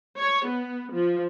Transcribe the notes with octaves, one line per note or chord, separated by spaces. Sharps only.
C#5
B3
F3